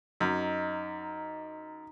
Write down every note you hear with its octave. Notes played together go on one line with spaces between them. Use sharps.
F#2 D#4